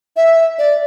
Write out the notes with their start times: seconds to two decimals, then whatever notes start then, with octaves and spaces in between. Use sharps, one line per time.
0.16 E5
0.58 D5